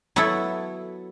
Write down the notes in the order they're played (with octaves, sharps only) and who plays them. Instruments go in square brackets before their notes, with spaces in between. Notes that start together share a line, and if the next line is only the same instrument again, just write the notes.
[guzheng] F#3 B3 E4 A4